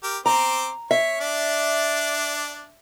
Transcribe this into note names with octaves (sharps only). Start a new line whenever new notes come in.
G4 A#4
C4 C5 A#5 D6
C#5 E5
D4 D5